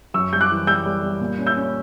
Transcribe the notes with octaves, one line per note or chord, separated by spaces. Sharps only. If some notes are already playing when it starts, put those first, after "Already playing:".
F#2 C#6 E6
G3 G6
D6 F#6
E3
G3 E6 G6
G3
G3
A#2
C#4
E6 G6
C#4